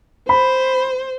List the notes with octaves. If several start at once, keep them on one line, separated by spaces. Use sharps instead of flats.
C5 B5